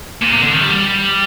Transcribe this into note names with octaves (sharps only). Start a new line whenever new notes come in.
A#2
C3
D3
D#3
G3